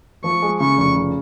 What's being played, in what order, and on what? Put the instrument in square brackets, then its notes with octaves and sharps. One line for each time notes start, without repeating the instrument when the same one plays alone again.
[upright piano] F3 [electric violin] C#6
[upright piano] G#3
[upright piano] C#3 [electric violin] C#6
[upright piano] F1
C#3